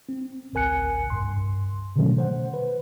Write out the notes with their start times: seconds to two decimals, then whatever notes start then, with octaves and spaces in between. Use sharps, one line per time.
0.09 C4
0.53 A1 D2 A#4 G#5 F#6 C#7
1.10 C2 G2 C6
1.96 B2 D3 D#3 F#3 A3 C#4
2.18 C5 F#5
2.54 B4